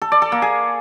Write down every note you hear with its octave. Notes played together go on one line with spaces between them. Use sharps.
A4
D5
A4
A#3
G#4